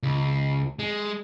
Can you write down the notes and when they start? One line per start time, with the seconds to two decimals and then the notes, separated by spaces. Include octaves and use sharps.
0.03 C#2
0.79 G#3